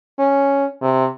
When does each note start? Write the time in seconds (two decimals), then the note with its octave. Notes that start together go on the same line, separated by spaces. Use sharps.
0.19 C#4
0.81 C3